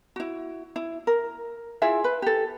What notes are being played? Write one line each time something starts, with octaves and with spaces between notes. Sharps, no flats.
E4 F#4
E4
A#4
E4 F4 G#4 E5
B4
G4 A4